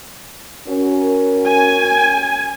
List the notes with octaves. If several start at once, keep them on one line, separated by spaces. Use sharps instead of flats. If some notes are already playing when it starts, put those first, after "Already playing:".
C#4 F#4 A#4
G#5